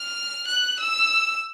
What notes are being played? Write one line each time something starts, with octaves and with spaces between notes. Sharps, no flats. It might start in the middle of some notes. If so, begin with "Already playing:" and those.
Already playing: F6
F#6
E6